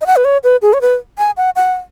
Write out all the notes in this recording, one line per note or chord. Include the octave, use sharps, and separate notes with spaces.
D#5
F#5
B4
C#5
B4
G#4
C#5
B4
G#5
F#5
F#5